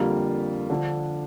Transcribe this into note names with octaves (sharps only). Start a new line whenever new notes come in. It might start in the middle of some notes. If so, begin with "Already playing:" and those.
Already playing: F2 D3 G3 A#3 F4
D3 F3 D4